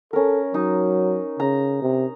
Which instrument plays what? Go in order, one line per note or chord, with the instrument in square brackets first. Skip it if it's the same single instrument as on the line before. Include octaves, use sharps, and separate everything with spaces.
[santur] C#4 A#4 [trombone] A4
[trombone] F#3 [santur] D#4
[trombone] C#3 [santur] A#5
[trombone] C3